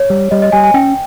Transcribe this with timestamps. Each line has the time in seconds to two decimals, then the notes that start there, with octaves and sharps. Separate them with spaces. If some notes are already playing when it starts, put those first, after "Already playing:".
Already playing: C#5
0.10 G3
0.31 G3 D#5
0.42 D#5
0.52 G3 G#5
0.64 G#5
0.74 C#4 G5